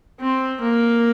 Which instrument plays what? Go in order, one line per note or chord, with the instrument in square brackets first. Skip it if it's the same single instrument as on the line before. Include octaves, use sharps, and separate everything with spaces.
[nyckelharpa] C4
A#3